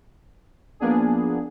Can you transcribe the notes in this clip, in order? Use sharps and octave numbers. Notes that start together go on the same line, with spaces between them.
F3 A#3 B3 D4 G#4